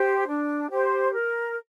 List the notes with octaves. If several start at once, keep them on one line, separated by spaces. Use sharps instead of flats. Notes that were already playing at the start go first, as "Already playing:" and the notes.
Already playing: G4 C5
D4
G4 C5
A#4